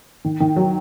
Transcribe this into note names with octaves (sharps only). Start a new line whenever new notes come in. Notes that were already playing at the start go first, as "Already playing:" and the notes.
D#3
D#3
F#3